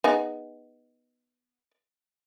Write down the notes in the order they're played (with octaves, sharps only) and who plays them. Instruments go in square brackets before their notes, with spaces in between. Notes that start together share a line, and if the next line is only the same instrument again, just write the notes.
[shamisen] B3 D#4 G#4